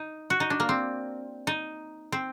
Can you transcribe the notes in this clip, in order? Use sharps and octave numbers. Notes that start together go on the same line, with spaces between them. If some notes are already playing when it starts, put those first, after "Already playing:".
Already playing: D#4
F#4
D#4
D4
A#3
C4
D#4
C4